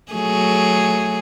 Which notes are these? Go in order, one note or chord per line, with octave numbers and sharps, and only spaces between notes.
F#3 A3 G#4